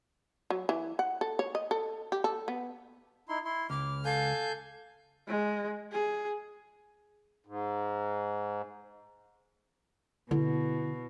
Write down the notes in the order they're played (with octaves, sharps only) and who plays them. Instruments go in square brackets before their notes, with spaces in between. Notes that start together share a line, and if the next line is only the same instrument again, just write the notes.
[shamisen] F#3
E3
F#5
A4
C#5
D#5
A4
G4
A4
B3
[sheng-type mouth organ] D#4 E4 C6
E4 C6
[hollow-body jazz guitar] C#2 [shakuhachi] D6 [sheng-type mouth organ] F6
[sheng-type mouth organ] A4 G#5 G6 [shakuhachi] F5
[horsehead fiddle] G#3
G#4
[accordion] G#2
[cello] B2 [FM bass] D3 [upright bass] E4